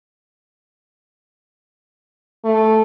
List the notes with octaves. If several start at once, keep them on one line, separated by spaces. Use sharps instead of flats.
A3